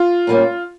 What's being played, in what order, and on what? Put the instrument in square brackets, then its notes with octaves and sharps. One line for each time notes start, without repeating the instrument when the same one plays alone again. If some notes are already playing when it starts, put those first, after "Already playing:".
Already playing: [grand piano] F4
[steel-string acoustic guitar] A#2 G3 A#3 C#4